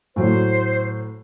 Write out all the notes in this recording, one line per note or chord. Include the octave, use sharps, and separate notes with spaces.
A2 F#3 C5